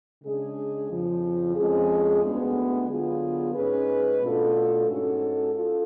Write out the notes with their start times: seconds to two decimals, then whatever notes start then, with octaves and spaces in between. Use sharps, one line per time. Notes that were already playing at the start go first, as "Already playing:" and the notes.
0.23 C#3 G#3 D4 G#4
0.89 F2 C#3 F3
1.56 F2 F3 G#3 C#4 G#4
2.22 D2 D3 G#3 B3
2.89 D3 F#3 B3 F4 G#4
3.55 G#2 G#3 C#4 G#4 B4
4.22 B2 A3 D4 F4 A4
4.88 G#2 G#3 C#4 F#4 A4
5.54 F4 A4